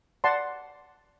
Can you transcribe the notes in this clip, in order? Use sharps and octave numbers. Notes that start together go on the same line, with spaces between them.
D5 F#5 A5 C6